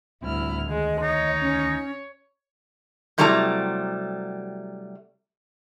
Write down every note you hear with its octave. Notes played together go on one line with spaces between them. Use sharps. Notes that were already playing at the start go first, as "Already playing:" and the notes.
D1 D2 G3 C4 E4 F6
D2 D#3 G#3 D#5
D#4 C#5
C#4
C3 F#3 G3 A3 E4 A#5